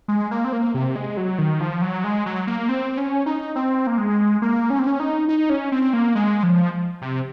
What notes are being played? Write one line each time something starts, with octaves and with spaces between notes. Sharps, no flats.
G#3
A#3
C4
A#3
C3
G#3
F#3
D#3
F3
F#3
G#3
F#3
A#3
C4
C#4
D#4
C4
A#3
G#3
A#3
C#4
C4
C#4
D#4
D#4
C#4
C4
A#3
G#3
F3
C3